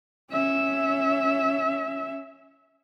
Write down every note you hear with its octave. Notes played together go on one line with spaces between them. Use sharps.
C#4 E5